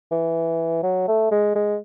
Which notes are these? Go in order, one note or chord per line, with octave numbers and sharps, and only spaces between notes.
E3
F#3
A3
G#3
G#3